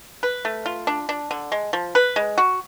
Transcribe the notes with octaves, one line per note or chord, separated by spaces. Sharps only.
B4
A3
F4
D4
D4
D3
G#3
F3
B4
G#3
F#4